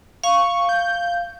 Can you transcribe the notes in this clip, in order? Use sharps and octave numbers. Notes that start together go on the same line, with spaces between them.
F5 C#6
G6